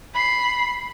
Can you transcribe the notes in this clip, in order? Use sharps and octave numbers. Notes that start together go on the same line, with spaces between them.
B5 C7